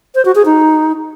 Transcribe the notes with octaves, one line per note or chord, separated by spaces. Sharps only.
C5
F#4
G#4
D#4